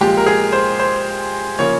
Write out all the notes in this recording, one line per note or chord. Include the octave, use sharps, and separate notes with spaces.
A#2 F3 G#3 G4
A#4
G#4
C5
C5
C#3 F3 A#3 C#5